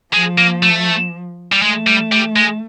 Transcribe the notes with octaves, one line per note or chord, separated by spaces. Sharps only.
F3 G#3
A#3
A3
G3
G#3 A3
G3
G3
G#3